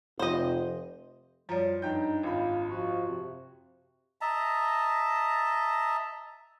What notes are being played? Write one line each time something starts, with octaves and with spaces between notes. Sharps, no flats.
F1 C5 D#5
F#2 F3 G3 C#5
G2 D4 D#4 G5 G6
G#1 F4 B5
F3 F#4
C3
D#5 E5 A5 A#5